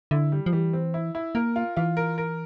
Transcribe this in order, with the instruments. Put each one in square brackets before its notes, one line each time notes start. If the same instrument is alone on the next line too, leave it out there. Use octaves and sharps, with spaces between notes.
[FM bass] D3 [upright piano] E4
[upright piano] G3
[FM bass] F3
[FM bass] E3 [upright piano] G3
[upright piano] C4
E4
E4
[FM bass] A#3 [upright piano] A#4
[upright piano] F4
[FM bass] E3 [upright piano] F4
[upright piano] A#4
A#4